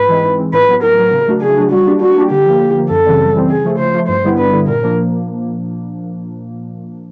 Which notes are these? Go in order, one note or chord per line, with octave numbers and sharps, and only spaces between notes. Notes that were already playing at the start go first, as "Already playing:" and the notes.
Already playing: G#2 B4
E3 G#3 C4
G#2
E3 G#3 C4
A2 B4
F#3 B3
A2 A#4
F#3 B3
C#3
F#3 A3 D4 F#4
C#3 G#4
F#3 A3 D4 F#4
G3 F#4
A#3 D4 G4
G3 F#4
A#3 D4 G4
D3 G4
F3 A#3
D3
F3 A#3
F#2 A4
C#3 E3 G3 C4
F#2
C#3 E3 G3 C4
C#3 G#4
F3 A3
C#3 C5
F3 A3
G2 C5
D3 G3 B3 E4
G2 B4
D3 G3 B3 E4
A#2 A#4
F3 A#3 D4